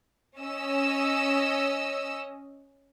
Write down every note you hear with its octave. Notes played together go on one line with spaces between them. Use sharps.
C#4 D#5 E6